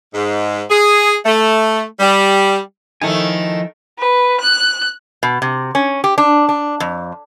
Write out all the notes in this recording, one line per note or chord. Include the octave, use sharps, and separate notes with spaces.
G#2
G#4
A3
G3
D#3 F3 A3 E4 G#5
B4
F#6
B2
C3
C#4
G4
D4
D4
F2